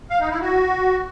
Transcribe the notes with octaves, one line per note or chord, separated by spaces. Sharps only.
F5
D#4
E4
F#4